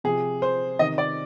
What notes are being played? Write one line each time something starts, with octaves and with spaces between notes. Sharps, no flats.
C3 F3 G#4
C5
C3 D#3 D#5
D5